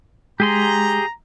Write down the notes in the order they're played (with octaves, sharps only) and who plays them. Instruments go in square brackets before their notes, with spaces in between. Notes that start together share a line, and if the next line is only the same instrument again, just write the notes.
[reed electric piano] G#3 [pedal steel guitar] G4 G#4 C6 [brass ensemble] A#5